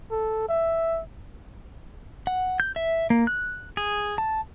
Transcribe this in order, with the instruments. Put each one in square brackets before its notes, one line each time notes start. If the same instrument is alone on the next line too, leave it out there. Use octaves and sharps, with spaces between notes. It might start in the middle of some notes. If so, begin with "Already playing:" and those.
[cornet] A4
E5
[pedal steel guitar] F#5
G6
E5
A#3
F#6
G#4
A5